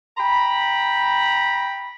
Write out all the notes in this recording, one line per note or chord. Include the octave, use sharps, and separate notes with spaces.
G5 A#5 B5